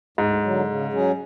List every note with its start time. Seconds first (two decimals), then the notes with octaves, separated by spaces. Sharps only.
0.18 D2 G#2
0.43 D3 F#3
0.67 C#3
0.92 F#3 C#4 G#4